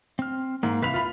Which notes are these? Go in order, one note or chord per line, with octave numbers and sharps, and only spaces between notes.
C4 F6
G#2 A#3
C2 B4 E5 F5 B5 F7
F4 B5